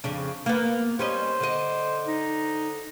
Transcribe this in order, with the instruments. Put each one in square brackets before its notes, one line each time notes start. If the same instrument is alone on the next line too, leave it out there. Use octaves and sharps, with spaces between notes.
[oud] F2 C#3 D4
A#3 B3
[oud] G3 C#4 D#5 [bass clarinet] C5
[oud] D3 D#5
[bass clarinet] D#4